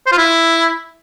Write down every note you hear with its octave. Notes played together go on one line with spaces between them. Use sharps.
C5
F4
E4